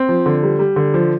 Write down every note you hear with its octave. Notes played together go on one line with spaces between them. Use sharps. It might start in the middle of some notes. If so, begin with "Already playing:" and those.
Already playing: C4
F3
D3
G3
G3
D3
F3